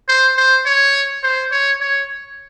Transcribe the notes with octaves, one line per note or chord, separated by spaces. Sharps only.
C5
C5
C#5
C5
C#5
C#5